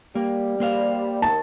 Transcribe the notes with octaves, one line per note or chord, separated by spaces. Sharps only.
G3 A#3
A#3 C5 F5
D#2 D#3 A5